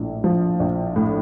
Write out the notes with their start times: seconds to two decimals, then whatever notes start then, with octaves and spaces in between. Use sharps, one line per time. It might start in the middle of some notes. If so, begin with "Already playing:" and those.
Already playing: A#1 A2
0.24 F3
0.60 A#1
0.96 A2